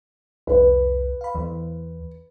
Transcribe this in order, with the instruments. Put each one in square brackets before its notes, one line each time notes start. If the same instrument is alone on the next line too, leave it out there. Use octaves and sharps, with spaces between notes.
[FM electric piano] C2 F2 [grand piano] B4
[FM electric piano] F5 B5
E2 E3